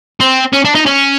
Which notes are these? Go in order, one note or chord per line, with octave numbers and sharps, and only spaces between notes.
C4
C#4
D4
D#4
C#4